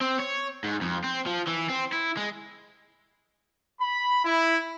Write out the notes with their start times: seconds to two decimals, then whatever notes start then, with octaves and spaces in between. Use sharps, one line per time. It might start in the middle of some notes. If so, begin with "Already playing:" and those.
0.01 C4
0.20 C#5
0.64 G#2
0.81 F2
1.04 C4
1.27 F3
1.48 E3
1.69 C4
1.92 E4
2.17 G#3
3.81 B5
4.25 E4